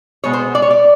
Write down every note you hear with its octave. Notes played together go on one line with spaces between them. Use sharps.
B2 G#3 B3 C#5
C5
D5
C#5
D5